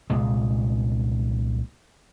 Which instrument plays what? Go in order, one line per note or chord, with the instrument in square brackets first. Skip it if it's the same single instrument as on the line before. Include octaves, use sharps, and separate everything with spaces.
[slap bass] C2 A#2 G#3